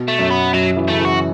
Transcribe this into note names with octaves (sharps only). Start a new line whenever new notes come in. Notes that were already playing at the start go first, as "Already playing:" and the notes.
Already playing: B2
A3
F#2
B3
F#2 F#3
E3
C#3 A3
E3
F#4